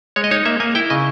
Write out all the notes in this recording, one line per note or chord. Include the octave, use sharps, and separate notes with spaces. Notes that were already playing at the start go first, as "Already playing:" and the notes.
G#3 C#5
D#5
D#4 C#5
A#3 E5
A#3 G#5
E4 G5
C#3 D#5